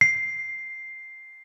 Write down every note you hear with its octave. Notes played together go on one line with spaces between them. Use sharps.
C7